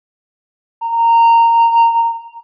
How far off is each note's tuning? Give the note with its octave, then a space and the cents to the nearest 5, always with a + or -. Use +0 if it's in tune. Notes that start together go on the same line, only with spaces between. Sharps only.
A#5 -15